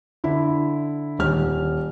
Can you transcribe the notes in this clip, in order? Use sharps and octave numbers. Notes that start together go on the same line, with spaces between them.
D3 E4
D#1 F6